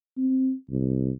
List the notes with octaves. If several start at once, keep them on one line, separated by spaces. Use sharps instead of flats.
C4
C2